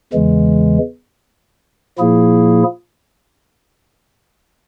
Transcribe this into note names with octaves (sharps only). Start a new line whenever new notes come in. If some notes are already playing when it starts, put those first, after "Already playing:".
E2 C#3 E3 G#3
A#2 F3 A#3 E4 G#4